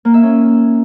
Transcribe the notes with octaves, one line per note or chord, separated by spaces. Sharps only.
A#3
E5
C#4